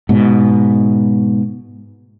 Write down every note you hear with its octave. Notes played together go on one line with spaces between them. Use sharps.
G#2 B2